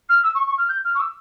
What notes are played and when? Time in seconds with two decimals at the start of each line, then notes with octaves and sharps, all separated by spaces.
0.09 F6
0.23 E6
0.34 C#6
0.46 C#6
0.58 F6
0.68 G6
0.84 F6
0.95 C#6
0.99 E6